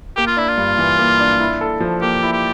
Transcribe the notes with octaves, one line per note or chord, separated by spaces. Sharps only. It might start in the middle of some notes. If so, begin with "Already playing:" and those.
A#3 G4
F4
D4 E4
F4
G2
E3
A#3
D4
E4
A4
F3
A#3 G4
E4
G4